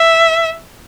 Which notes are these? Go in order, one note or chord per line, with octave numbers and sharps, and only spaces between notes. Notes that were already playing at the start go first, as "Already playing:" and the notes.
Already playing: E5